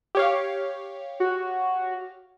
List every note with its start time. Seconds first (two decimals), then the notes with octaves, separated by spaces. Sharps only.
0.15 G4 C#5 F5
1.20 F#4